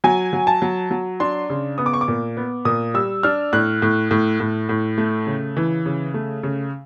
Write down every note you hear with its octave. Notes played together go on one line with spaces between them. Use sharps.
F#3 G#5
F#3
A5
F#3
F#3
D4 C6
C#3
B3 D#6
D6
C#6
D6
A#2
B3
A#2 D#6
G3 E6
D4 F6
A2 F#6
A2
A2
A2
A2
A3
C#3
E3
C#3
A3
C#3